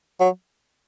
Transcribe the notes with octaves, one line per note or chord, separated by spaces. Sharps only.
F#3